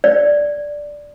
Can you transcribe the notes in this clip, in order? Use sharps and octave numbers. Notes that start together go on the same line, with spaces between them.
D5